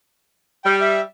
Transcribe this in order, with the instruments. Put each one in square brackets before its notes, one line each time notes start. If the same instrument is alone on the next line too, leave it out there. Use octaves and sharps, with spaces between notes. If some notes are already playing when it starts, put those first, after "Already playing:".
[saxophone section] G3 [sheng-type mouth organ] G5
[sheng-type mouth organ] E5